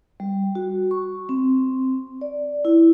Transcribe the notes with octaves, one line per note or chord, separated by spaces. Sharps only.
G3
F#4
C#6
C4
D5
E4